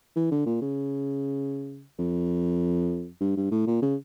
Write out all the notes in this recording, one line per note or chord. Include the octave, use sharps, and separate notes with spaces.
E3
D3
A#2
C#3
F2
G2
G2
A2
A#2
C#3